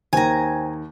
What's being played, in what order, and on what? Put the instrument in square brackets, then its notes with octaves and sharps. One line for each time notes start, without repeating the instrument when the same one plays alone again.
[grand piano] D#2 D#3 [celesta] C5 G5 [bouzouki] G#5 A#5